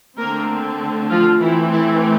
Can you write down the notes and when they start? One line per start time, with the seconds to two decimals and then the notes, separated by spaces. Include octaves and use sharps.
0.18 D3 A3 A#3 C4 A#4
1.10 F3 F4
1.41 E3 A3 C4 E4
1.72 E4